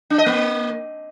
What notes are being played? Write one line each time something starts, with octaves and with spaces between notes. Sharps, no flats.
D4
D#5
A#3